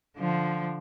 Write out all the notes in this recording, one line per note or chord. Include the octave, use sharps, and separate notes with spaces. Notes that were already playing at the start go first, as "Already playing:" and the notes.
D3 F3